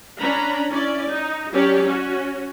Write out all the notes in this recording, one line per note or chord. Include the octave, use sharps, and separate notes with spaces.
C#4 D4 A#5 B5
C#4 E4 D5
D#4
F#3 C#4 G4 C#5 D5
C#4 F#4